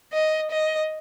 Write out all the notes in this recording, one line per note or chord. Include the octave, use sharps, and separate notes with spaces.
D#5
D#5